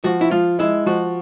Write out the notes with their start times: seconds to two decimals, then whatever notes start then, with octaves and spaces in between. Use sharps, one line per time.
0.04 F3 F#4
0.21 E4
0.31 F3 F4
0.59 G#3 E4
0.86 F3 F#4